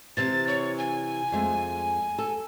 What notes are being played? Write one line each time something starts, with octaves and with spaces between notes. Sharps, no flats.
C3 E3 A6
C#5
G#5
F2 G#3 A3
A4